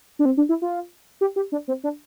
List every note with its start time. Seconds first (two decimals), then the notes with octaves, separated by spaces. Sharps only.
0.19 D4
0.25 C4
0.37 D4
0.49 E4
0.62 F4
1.21 G4
1.36 G4
1.52 D4
1.68 C4
1.84 D4